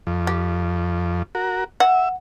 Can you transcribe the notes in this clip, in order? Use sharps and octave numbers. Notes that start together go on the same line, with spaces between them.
F2
G4
F#4 A#4
E5 F#5